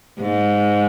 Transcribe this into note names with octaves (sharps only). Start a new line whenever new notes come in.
G#2